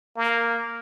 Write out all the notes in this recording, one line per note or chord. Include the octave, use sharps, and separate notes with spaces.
A#3